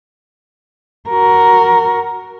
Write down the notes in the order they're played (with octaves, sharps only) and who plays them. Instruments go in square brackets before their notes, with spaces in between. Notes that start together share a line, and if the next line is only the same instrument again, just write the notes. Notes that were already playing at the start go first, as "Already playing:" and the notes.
[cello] F#4 A#4